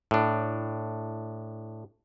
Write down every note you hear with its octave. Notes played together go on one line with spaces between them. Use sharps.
A2 D4